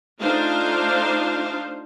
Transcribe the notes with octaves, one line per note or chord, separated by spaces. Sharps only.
A3 D4 D#4 F4 C5 F5